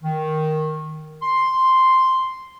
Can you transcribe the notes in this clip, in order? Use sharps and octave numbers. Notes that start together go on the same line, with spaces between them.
D#3
C6